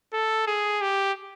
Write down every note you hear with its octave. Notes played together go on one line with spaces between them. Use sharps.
A4
G#4
G4